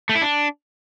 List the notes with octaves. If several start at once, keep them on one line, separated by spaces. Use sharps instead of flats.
A3
E4
D4